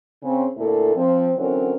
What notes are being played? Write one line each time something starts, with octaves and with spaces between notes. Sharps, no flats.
C#3 C4
D2 A#2 A3 A#3 E4 A4
F3 C4
D3 E3 F#3 C4 C#4 A#4